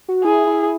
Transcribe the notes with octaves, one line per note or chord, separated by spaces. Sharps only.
F#4
E4 G#4
E4